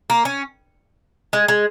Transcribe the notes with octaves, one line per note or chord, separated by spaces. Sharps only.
A#3
C#4
G#3
G#3